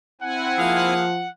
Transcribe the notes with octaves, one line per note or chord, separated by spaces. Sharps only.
C4 E4 F#5 G#5
F3 A#3 G#4 F5